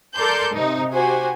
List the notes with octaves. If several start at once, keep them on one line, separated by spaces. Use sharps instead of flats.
A4 A#4 D5 A5 C6 G6
C3 D#4
F#4 G4 C5 G#5